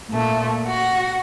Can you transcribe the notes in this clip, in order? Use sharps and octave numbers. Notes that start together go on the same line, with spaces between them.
A#2 A3
F#4 A#6